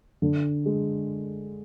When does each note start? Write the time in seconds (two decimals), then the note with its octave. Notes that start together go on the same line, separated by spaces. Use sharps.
0.22 D3
0.66 G#3